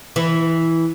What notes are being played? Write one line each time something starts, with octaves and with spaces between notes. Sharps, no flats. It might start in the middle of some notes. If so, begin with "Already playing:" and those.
E3